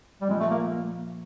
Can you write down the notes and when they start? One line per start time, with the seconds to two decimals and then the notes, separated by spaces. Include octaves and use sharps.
0.21 G3
0.29 A#2 F3 G#3 A#3
0.40 A3
0.50 A#3